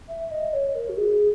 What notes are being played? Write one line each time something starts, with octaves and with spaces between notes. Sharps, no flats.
E5
D#5
C#5
A#4
F#4
G#4